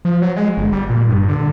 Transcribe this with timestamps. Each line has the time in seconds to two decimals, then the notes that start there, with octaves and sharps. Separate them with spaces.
0.05 F3
0.22 F#3
0.36 G#3
0.57 G1
0.72 G3
0.90 A#2
1.09 G2
1.28 D3